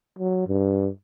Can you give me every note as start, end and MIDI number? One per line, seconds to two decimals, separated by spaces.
0.19 0.43 54
0.47 0.89 43